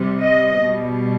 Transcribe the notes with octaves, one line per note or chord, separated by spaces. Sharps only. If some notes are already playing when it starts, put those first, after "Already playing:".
Already playing: C3 G3
D#5
B2 G3